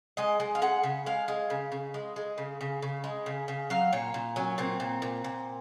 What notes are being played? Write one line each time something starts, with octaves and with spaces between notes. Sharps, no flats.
G#3 D#5
G#3
F5
G#3 F#5
C#3
G#3 F5
G#3
C#3
C#3
G#3
G#3
C#3
C#3
C#3
G#3
C#3
C#3
F#3 F5
A#2 C#5
A#2
F#3 C#4
A#2 C4
A#2
A#2
A#2